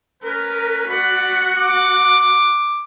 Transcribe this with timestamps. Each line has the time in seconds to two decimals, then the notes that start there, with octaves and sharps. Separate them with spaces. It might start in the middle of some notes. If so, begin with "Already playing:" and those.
0.23 C#4 A#4 B4
0.88 F#4 D5 F#5 B5
1.55 D6